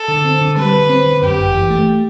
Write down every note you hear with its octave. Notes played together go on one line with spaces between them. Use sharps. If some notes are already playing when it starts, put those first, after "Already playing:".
Already playing: A4
D3
C4
D3
G3 B4
D3
C4
D3
F#2 G4
G1
E3
A3